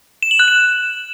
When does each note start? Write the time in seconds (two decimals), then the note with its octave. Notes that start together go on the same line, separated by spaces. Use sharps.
0.23 E7
0.31 F#7
0.39 F#6
0.48 E7